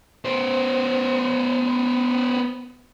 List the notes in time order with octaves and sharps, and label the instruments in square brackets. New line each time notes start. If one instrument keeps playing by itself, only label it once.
[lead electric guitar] B3 C5